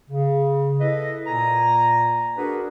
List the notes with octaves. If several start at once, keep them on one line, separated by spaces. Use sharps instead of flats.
C#3
E4 A4 B4 D#5
A#2 A#3 G#5 A#5
D4 F#4 G#4 A#4 B4